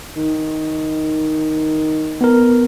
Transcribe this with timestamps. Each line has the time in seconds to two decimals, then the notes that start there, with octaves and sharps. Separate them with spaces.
0.16 D#3
2.21 B3 A#4